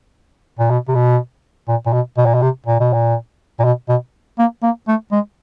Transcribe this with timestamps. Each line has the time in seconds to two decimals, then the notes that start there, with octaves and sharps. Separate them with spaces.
0.59 A#2
0.70 B2
0.88 C3
0.95 B2
1.68 A#2
1.86 A#2
1.93 B2
2.18 B2
2.26 A#2
2.34 B2
2.42 C3
2.67 A#2
2.80 B2
2.93 A#2
3.60 A#2
3.65 B2
3.89 B2
4.39 A#3
4.63 A#3
4.88 A3
5.12 G#3